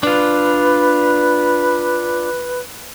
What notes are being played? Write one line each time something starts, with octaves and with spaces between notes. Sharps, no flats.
D4 F4 B4